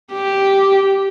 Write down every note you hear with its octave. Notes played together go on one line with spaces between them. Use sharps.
G4